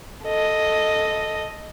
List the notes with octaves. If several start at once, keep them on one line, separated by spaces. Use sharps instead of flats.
A4 D#5